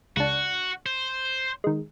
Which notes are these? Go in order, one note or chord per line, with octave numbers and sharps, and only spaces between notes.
C#2 D4 F#4
C5
D#3 G#3